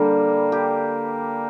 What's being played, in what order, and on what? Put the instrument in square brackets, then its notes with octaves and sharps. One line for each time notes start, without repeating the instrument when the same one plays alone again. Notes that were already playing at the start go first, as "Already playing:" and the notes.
Already playing: [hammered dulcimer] D3 G3 [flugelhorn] A#3
[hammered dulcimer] G4